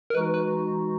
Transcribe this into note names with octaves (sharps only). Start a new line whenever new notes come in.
A#4
E3 G#3 D#4 F#4 B4
B4